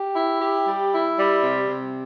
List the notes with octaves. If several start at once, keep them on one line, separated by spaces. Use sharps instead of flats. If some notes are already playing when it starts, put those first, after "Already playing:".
Already playing: G4
E4
G4
G3
E4
G3
C3
C3